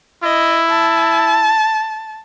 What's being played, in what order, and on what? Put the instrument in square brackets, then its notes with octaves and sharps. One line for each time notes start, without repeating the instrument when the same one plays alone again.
[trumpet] E4 [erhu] D#5
[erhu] A5